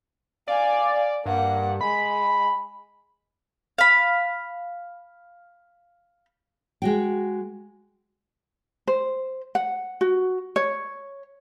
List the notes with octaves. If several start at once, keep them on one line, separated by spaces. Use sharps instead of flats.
D5 F5 G#5
G2 A#3 F#5
G#3 B5
F5 B5
G#3 F#4 G5
C5
F#5
F#4
C#5